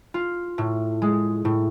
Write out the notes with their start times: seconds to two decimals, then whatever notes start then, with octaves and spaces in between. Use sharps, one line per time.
0.14 F4
0.58 A2
1.02 G#3
1.45 A2